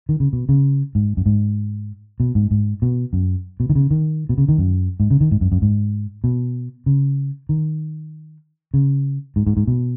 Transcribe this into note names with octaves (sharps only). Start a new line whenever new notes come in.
D#3
C#3
B2
C#3
G#2
F#2
G#2
B2
G#2
G#2
B2
F#2
B2
D#3
C#3
D#3
B2
C#3
D#3
F#2
G#2
C#3
D#3
G#2
F#2
F#2
G#2
B2
C#3
D#3
C#3
G#2
G#2
G#2
B2